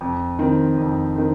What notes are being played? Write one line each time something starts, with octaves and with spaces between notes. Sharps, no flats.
F2
D#3 C4
F2
D#3 C4